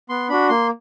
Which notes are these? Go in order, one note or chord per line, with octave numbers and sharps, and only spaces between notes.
B3 C6
D4 F#4 B5
A#3 C6